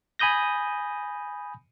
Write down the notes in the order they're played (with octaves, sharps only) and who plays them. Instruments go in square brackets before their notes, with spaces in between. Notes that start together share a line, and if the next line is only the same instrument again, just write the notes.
[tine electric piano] G#5 B5 D#6 G6 A#6